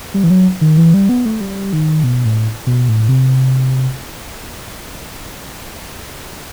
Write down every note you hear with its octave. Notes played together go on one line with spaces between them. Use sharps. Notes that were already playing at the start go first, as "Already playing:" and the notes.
G3
E3
F#3
D#3
E3
G3
B3
A3
G3
D#3
B2
A2
B2
A2
C3